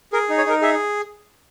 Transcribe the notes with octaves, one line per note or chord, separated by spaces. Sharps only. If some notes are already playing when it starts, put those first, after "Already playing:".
G#4 A#4
D#4
C#5
D#4 A#4
G#4 E5